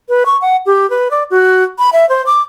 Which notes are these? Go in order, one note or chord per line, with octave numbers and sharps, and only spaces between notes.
B4
C#6
F#5
G4
B4
D5
F#4
B5
E5
C5
D6